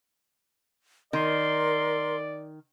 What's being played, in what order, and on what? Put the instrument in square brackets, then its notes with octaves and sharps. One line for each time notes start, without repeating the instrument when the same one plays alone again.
[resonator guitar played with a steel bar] D#3 [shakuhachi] A#4 [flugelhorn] D5 [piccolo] C6